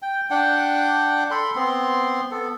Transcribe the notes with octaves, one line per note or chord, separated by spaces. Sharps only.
G5
D4 F#5 G5
A4 B5 C6
B3 C4 C6
B3 A4